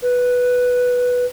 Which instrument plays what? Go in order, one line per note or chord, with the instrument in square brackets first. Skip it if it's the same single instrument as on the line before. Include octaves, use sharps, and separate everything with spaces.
[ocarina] B4